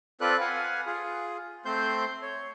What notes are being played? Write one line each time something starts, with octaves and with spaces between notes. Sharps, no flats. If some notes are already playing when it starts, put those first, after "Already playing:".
C4 F4 A4 B4 D5 F#6
B4 F5 F#5 G#5
F4 G#4
A3 C4 C5 C6 G6
C#5